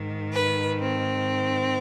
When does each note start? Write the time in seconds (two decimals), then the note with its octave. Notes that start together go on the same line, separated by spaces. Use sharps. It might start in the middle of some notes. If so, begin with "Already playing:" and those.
Already playing: G#2 D#3
0.32 B4
0.79 C4